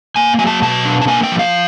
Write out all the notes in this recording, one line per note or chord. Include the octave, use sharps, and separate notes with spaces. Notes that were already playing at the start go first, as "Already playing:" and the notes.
A#3 G#5
F#3 G#5
A5
B2 A5
D4
A5
A#3 G#5
G5
F3
F5